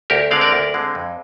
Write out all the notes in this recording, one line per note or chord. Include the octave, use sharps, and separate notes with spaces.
D2 G4 A#4
D3 G#3 C4 D5 F5
A#4 D5
D2
D3 G#3 C4
F2